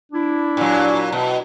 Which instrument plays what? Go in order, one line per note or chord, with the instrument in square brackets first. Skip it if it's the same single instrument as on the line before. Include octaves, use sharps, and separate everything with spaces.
[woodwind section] D4 E4
[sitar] A#2 F#3
B2